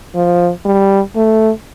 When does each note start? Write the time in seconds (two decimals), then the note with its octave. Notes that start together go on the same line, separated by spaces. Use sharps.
0.15 F3
0.65 G3
1.15 A3